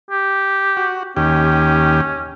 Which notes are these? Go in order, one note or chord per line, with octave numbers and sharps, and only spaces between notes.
G4
F#4
D#2 C#4 G4